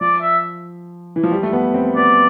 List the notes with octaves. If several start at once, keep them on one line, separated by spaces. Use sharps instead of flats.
F3 D5
E5
E3
F3
G3
A3
B3
C4
B3 D5